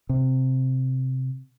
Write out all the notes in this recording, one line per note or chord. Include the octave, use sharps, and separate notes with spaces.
C3